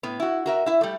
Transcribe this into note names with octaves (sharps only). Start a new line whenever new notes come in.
A2 B3
E4 F#4
F#4 A#4 E5
E4 E5
G3 A3